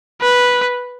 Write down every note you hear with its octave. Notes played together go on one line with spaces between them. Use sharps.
B4